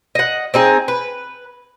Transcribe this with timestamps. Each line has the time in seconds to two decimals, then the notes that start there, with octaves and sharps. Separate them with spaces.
0.15 D#5 F#5
0.54 C4 D#4 G#4
0.88 B4